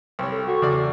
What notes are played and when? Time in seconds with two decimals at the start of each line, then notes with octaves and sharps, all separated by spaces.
0.19 C2 C#5
0.32 A4
0.48 F#4
0.62 E2 C#3 D5